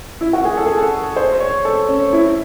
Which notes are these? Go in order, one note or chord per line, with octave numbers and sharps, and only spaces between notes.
E4
F#4
G#4
A4
G#4
A4
C5
C#5
A4
C#4
E4